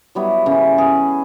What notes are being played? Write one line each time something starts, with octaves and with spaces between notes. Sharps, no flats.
F#3 G3 B3 E4
C#3 E3 A#3 C#4
B3 G#4